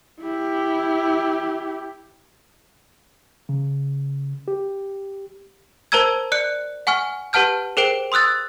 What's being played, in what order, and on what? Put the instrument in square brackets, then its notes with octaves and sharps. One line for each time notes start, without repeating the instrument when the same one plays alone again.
[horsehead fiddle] E4 G4
[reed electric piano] C#3
G4
[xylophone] A#4 C5 A5 A#5 E6 G#6
D5 F#6 C#7
F#5 G#5 C#6 F6
G4 B4 F#5 A5 F6 G6
G#4 A#4 C5 G5 D7
C6 D#6 E6 F#6 A6